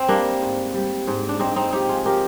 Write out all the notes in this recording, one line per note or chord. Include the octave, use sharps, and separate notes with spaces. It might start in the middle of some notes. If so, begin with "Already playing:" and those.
Already playing: C4
G3 A#3 D4
G#2
G3
G#2
D4
G#2 C4 D#4
C4 D#4
F3 D#4 G4
F4 G#4
F3 G4 A#4